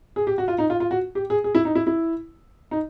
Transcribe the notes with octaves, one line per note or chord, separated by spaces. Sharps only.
G#4
G4
F#4
F4
D#4
F4
F4
F#4
G4
G#4
G#4
E4
D#4
E4
E4
D#4